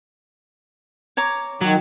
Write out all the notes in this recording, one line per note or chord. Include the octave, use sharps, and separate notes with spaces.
C#5 A#5 D6
D#3 F#3